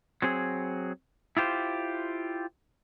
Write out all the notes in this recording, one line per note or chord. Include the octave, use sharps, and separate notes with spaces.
F#3 C4 G#4
E4 F4 G4 C5